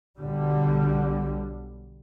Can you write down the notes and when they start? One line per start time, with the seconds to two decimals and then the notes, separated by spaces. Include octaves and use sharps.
0.18 B1 D3 G3